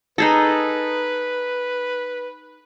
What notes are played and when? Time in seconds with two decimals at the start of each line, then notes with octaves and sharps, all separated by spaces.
0.18 D#4 G#4 A4 B4